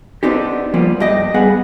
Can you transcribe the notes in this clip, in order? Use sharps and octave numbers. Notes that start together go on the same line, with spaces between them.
B3 C4 D4 D#4 G4
F3 G3 A#3 B3
G2 G4 D#5
G3 B3 G#4 F#5